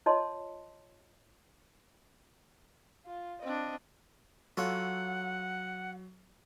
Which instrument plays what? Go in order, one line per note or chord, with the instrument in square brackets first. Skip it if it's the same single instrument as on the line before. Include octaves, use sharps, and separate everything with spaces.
[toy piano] F4 C#5 D#5 A5 C6
[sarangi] F4
[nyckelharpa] C4 D4 [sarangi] D#5
[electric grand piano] F#3 [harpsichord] F4 A4 C#5 [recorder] F#5